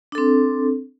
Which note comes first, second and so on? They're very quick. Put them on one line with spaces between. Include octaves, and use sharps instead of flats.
D4 A4 C4